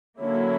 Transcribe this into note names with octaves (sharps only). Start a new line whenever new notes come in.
D3 F#3 A#3 C#4 E4 C#5